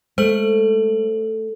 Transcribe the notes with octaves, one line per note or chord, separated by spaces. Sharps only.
G#3 A3 C5 F#7